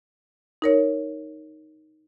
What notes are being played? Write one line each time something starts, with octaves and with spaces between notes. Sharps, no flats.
D#4 A#4 C#5